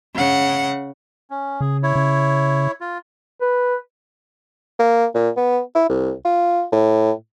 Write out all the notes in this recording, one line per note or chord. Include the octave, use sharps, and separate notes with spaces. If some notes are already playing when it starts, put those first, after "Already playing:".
C#3 F#5
C#4
C#3 G#4
E4 C#5
C#3
F4
B4
A#3
A#2
B3
E4
C2
F4
A2